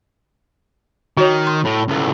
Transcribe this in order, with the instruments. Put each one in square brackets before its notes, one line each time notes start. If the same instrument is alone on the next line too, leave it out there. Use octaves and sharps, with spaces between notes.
[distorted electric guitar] D#3 [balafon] F#4 C#5
[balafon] C6
[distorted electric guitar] A2
C#2 A2